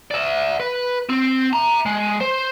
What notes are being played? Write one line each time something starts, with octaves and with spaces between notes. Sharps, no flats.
D5 E5
B4
C4
E5 A#5
G#3
C5